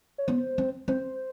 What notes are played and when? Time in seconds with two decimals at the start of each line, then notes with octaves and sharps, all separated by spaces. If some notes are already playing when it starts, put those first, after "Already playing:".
0.18 C#5
0.28 B3 C5
0.58 C4
0.88 C4 C5